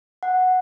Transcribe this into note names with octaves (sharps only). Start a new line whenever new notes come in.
F#5